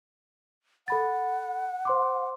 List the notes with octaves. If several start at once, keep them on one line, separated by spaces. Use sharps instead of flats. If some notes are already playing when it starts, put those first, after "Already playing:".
A4 F#5 B5 A6
C5 C6 D6